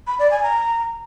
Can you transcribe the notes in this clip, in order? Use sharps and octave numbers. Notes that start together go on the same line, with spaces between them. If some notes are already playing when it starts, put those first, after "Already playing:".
B5
D5
G#5
A#5